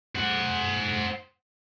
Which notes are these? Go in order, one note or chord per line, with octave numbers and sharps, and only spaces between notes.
C5 F#5